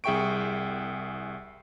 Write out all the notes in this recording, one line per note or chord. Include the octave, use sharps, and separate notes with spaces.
C2 G#4 E5 G5 C#6 D7